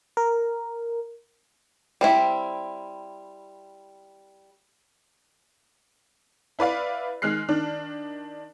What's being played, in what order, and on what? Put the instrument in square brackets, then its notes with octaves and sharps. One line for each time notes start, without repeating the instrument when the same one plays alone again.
[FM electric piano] A#4
[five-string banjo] G3 C4 E4
[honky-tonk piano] E4 B4 D5 F5
D#3 G#3 F6 F#6 C7
D#3 D4